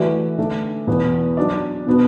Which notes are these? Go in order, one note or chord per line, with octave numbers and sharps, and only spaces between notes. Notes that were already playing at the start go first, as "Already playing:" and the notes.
Already playing: E3 A3 F#4 B4 D5
D3 A3 D4 A4
E2 B2 B3
F#3 D4 F#4 D5
B2 B3 D4 F#4